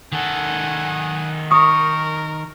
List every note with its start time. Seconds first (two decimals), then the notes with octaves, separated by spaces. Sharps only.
0.12 D#3 A4 F#5 G#5
1.51 A#4 C#6 D#6